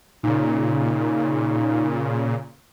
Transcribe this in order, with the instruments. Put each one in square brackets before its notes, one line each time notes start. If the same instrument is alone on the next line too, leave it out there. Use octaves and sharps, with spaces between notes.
[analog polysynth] A#2 C#3 [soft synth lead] D#4